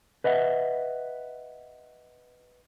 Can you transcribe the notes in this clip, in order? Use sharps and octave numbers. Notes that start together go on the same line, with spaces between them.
B4 D#5 E5 F#5